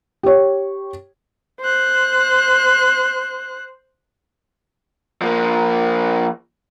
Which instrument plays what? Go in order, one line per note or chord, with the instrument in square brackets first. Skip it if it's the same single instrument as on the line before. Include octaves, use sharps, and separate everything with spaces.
[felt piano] G4 C#5
[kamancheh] C5 F#6
[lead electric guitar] F3 A#3